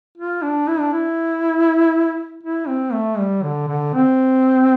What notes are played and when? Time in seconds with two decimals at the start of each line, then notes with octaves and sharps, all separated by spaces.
0.17 F4
0.42 D4
0.68 E4
0.80 D4
0.93 E4
2.43 E4
2.68 C4
2.93 A3
3.18 G3
3.43 D3
3.68 D3
3.93 C4